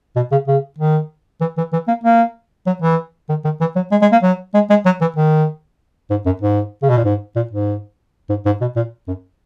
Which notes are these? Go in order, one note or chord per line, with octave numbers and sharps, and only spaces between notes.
B2
C#3
C#3
D#3
E3
E3
E3
A#3
A#3
F#3
E3
D#3
D#3
E3
F#3
G#3
G#3
A#3
F#3
G#3
G#3
F#3
E3
D#3
G#2
F#2
G#2
C#3
B2
A#2
G#2
A#2
G#2
G#2
G#2
B2
A#2
F#2